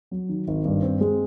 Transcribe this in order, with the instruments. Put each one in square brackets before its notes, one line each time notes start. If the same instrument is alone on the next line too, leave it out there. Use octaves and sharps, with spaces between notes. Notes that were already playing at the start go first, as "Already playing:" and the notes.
[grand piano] F#3
D#3
G#1
G2
C4
G#3